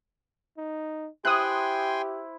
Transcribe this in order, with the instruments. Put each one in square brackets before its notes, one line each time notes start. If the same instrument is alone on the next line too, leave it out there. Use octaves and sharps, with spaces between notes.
[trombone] D#4
[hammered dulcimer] E4 C5 [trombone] G4 [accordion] G5 G#5 C6 [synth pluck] D#6 F#6